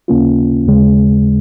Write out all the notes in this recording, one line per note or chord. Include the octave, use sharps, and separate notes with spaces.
D#2 C#3 A#3 C#4 F4
D#2 C#3 G#3